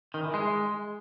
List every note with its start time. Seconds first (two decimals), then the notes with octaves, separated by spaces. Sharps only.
0.14 D#3
0.24 E3
0.34 G#3